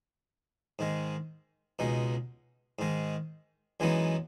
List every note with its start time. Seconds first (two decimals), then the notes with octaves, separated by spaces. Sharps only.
0.79 G#2 D#3 G#3
1.79 C#2 B2 G#3 D#4
2.79 G#2 D#3 G#3
3.80 F#2 E3 G#3 B3 D#4